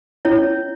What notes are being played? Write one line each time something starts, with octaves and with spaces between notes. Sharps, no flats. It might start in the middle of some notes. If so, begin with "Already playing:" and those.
C#4 E4 C#5